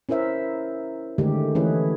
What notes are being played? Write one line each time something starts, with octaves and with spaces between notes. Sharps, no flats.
C#4 E4 A#4 C5 E5
D3 D#3 G#3 A3 G4
E3 A3 C#4 E4 G#4 B4